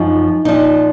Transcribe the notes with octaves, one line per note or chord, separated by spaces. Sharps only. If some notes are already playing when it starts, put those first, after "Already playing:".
Already playing: F#2 F3 D#4
A#2 F3 D#4